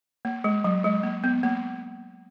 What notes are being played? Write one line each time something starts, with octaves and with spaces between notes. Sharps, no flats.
A#3
G#3
F#3
G#3
A#3
B3
A#3